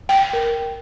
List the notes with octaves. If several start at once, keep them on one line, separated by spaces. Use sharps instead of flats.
G5
A#4